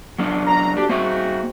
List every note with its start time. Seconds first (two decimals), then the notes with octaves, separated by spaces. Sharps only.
0.19 F#3 A#3 D4
0.47 A#5
0.77 D2 D4 G4
0.89 G#2 A#3 C4 F#4 E5